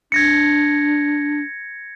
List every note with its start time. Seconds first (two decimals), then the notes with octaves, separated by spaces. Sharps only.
0.12 D4 G#6 A#6 C#7